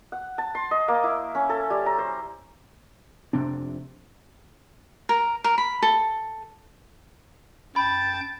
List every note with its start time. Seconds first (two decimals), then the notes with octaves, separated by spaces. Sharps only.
0.12 F#5
0.38 A5
0.55 C6
0.71 D#5
0.88 A#3
1.04 E4
1.35 C#4
1.49 A4
1.70 G3
1.86 A#5
1.98 C5
3.33 F1 C3 C4 D4
5.09 A#4
5.44 A#4
5.58 B5
5.82 A4
7.76 F#2 G5 A5 B5 G6